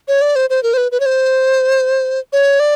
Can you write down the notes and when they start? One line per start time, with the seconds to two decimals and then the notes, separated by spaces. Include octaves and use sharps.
0.08 C#5
0.22 D5
0.36 C5
0.50 C5
0.63 A#4
0.74 C5
0.77 B4
0.92 B4
1.00 C#5
1.06 C5
2.33 C#5
2.60 D5